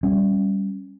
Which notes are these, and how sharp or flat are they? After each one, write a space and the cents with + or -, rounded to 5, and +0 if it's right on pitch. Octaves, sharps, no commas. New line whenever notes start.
G3 +0 C#4 -5